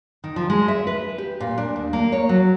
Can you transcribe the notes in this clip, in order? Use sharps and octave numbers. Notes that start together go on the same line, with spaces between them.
D#3
F3
G#3
E5
B4
G4
A#2
D4
D#2
A#3
C#5
F#3